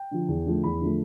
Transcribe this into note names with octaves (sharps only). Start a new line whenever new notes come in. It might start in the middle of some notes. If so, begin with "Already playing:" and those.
Already playing: G5
D3 F3
E2
D3 F3 A3
E2 B5
D3 F3 A3